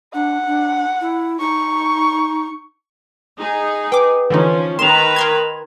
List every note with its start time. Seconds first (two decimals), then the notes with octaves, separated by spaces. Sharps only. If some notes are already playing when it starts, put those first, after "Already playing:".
0.14 D4 F#5
0.47 D4
1.01 E4
1.40 D#4 C#6
3.38 D#4 G#4
3.92 B4 G5 D6
4.30 D3 E3 F3 C#4 D#4
4.79 D#3 B4 A#5 C6 E7 F7
5.16 A#4 C6 G#6